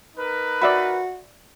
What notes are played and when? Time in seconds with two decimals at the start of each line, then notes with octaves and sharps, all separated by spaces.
0.16 D#4 A#4 B4
0.62 F#4 D5 E5 B5